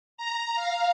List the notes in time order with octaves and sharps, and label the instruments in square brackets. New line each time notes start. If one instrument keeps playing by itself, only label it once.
[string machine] A#5
F5